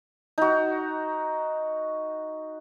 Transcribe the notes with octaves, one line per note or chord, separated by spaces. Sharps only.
D#4 F#4